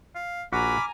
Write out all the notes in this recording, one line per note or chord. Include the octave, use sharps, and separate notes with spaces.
F5
A#1 F#4 F#5 G#5 A#5 B5 D6 F6